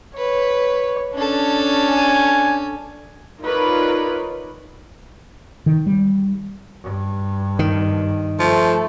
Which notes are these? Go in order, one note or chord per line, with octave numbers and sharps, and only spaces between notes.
B4 C#5
C#4 D4 A4
G#5
D#4 F4 A#4 B4 C#5 D5
D#3
G3
G2
D#3
F3 A3